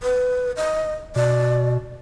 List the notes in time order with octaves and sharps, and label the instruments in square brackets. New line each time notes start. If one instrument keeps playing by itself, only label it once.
[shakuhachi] B4
D#5
[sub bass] B2 [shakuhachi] D5